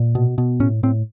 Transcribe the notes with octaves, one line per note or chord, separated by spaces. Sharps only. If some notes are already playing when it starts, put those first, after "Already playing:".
Already playing: A#2
B2
B2
A2 C#4
A2 C4